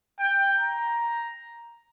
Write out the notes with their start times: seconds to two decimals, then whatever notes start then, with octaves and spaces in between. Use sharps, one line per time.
0.19 G5
0.57 A#5